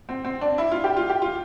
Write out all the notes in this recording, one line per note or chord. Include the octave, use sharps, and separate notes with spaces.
C4
C4
D4
E4
F4
G4
F4
G4
F4